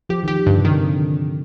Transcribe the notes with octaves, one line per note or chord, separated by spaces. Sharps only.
F3 G4
D#3
F3 G4
G2 D3
C3
D#3
D3